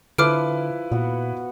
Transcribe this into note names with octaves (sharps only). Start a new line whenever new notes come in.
D3 F3 E4 B4 D6 F6 D7
A#2 B3 F#4